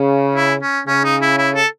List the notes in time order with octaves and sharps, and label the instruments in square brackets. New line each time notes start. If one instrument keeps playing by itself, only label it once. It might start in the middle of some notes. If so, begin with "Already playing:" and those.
Already playing: [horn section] C#3
[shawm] E4
C#4
[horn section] C#3 [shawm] C#4
[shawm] D#4
E4
E4
A4